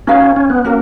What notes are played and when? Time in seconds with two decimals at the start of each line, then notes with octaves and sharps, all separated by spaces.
0.07 C#4 D#4 F#4 B4 F5
0.36 C#4
0.50 B3
0.65 A#3 C#4 F#4 A#4